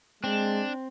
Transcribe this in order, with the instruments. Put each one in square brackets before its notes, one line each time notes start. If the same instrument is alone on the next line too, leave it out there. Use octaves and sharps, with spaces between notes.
[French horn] G#3 [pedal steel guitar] C4 [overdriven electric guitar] D4